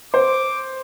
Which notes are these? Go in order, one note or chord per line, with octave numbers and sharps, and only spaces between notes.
C5 D6